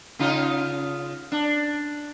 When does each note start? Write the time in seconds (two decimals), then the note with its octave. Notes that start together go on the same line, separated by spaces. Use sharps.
0.19 C#3 D#4 F4
1.32 D4